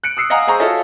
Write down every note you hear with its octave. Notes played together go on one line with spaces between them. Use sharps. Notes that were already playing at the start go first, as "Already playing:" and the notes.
F#6 C#7 D7
D#6 E6 C7 C#7
D#5 F5 F#5 G#5 A#5 D#6
G#4 C5 G#5 A#5 C#6
F4 F#4 A4 C#5 D#5 E5